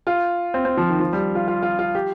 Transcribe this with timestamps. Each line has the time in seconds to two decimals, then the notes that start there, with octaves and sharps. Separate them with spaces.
0.07 F4
0.54 C4
0.65 C4
0.77 F3
0.89 D#3
1.00 F3
1.13 G3
1.35 F4
1.48 F4
1.63 F4
1.79 F4
1.95 G4